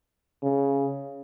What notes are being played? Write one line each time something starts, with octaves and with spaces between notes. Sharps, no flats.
C#3